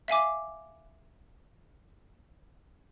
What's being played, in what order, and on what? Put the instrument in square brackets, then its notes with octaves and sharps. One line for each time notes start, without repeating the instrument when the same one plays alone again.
[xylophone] E5 F5 G#5 D6